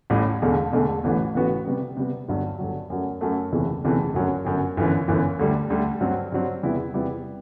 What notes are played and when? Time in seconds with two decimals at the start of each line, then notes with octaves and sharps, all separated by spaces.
0.10 A1 A2 G3
0.42 E1 E2 D3 A3
0.73 E1 E2 D3 A3
1.04 A1 A2 E3 B3 F#4
1.34 A1 A2 E3 B3 F#4
1.65 C3 G3 B3
1.97 C3 G3 B3
2.29 G1 G2 F#3
2.59 G1 G2 F#3
2.90 F#2 F#3 A3
3.21 F#2 F#3 A3
3.52 F#1 E2 C3 E3 A3
3.84 F#1 E2 C3 E3 A3
4.14 G1 F#2 F#3
4.45 G1 F#2 F#3
4.77 G1 F#2 E3
5.08 G1 F#2 E3
5.39 D2 D3 G3
5.70 D2 D3 G3
6.01 G2 F#3 C4
6.32 G2 F#3 C4
6.63 E2 C3 G3 B3 E4
6.94 E2 C3 G3 B3 E4